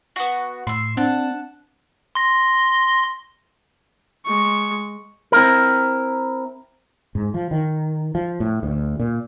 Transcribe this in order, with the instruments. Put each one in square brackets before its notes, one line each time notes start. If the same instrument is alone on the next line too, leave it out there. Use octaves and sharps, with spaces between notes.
[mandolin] B3 F#4
[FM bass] A2 [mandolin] E5 C6
[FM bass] C4 [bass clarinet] D4 [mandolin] F#5 A5
[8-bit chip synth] C6 A#6
[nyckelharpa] G#3 C#6
[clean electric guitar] C4 E4 A#4
[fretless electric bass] G#2
F3
D#3
F3
A2
D2
A#2